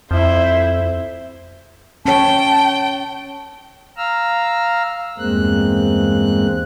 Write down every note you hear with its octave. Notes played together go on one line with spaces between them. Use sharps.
F2 E4 C5
C#4 C#5 G5 A5
F5 A#5 E6 F6
E2 G2 G#3 A#3 C4 F#6